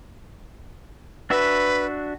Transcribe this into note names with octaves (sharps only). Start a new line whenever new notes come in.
D4 F#4 B4 E5